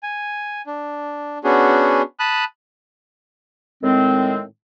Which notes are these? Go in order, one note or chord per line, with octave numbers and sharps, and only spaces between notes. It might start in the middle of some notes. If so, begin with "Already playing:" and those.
G#5
D4
B3 C#4 D4 F#4 G#4
A5 B5 D#6 F#6
A2 D#3 G#3 C4